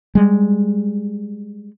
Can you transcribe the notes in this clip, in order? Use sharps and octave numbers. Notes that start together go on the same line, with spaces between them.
G3 G#3